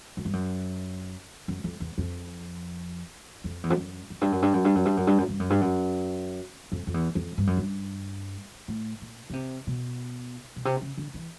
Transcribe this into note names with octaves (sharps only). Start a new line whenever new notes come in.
F#2
G2
F#2
F#2
F2
E2
F2
F2
E2
F2
F#2
F#2
G2
F#2
G2
F#2
G2
F#2
G2
F#2
G2
F#2
G2
F#2
G2
F#2
F2
F2
E2
F2
G2
F#2
G2
A2
A#2
C#3
C3
B2
B2
C3
C#3
D3
E3